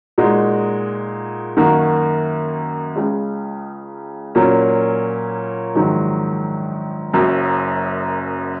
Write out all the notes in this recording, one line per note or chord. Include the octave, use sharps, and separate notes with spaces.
A#2 G#3 D#4 F#4
F#2 D#3 A#3 F#4
C#2 C#3 G#3
A#2 F#3 A#3 C#4
A#1 G#2 D#3 F#3
F#1 F#2 F#3